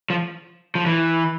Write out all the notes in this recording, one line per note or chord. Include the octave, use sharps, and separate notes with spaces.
F3
F3
E3